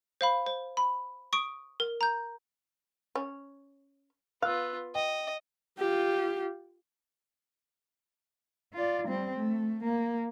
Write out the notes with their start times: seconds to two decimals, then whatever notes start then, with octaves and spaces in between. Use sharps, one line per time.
0.21 C5 F5 B5
0.46 C5
0.77 B5
1.33 C#6 D#6 D7
1.80 A#4
2.01 A#5 G6
3.15 C#4
4.42 B3 F4 F5 E6 F#6
4.95 D#5 G5
5.79 F4 G4
8.73 F4 D5
9.08 G3 C4
9.36 A3
9.83 A#3